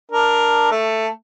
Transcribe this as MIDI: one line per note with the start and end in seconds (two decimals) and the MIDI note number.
0.11 0.69 62
0.11 0.69 70
0.71 1.07 57
0.71 1.07 69